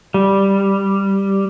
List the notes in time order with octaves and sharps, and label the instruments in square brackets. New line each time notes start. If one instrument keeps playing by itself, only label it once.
[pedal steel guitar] G3